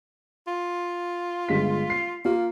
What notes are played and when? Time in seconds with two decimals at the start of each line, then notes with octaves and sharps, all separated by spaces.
0.47 F4
1.49 G1 G#3 B6
1.90 C7
2.25 A#3 F4